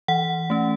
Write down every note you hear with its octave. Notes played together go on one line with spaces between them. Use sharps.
E3 F#5
A3 C#4